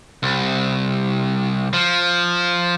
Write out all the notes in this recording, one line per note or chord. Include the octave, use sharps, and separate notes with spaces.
C2
F3